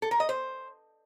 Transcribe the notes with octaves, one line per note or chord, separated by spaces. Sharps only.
A4
A#4
D#5
C5